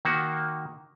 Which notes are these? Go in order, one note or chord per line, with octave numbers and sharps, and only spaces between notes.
D#3 A#3 F#4